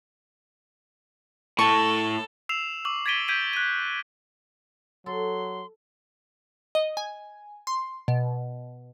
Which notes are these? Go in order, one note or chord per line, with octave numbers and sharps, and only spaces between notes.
A2 A4 C#6
E6 C7 E7 F7
C#6 D6 E6 F#7
G#6 A6 B6 D7 D#7 G7
G6 G#6 B6 D7 D#7
F#6 D#7
F#3 A4 C6
D#5
G#5
C6
B2